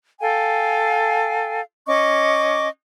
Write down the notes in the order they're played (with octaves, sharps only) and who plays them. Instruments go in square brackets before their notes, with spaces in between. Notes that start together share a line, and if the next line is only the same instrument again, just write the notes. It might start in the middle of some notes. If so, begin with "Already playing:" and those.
[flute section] A4 F5 G5 G#5
C#4 D#5 C#6 D6